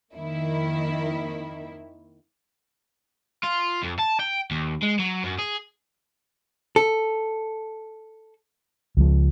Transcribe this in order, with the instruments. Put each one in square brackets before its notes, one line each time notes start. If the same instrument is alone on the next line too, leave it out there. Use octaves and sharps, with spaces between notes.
[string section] F2 D#3 A#3 E4
[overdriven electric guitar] F4
F2
A5
G5
D#2
G#3
F#3
F#2
G#4
[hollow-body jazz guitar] A4
[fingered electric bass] C#2 F3